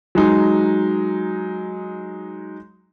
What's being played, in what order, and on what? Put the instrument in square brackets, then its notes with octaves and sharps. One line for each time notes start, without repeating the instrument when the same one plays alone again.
[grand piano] F#3 G#3 D#4